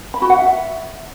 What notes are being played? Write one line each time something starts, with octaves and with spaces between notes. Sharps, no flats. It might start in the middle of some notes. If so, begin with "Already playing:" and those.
B5
F#4
F#5
E5